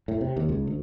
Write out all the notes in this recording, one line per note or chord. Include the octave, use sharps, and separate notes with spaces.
A2
C3
D#2
C#2
D2